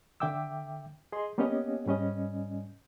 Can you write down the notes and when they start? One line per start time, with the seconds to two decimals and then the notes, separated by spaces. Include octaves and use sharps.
0.20 D3 E5 G5 D6 E6
1.12 G#4 D#5 C6
1.38 A#3 B3 C#4 G4 C#5 D#5
1.86 G#2 G3 C#4 D#5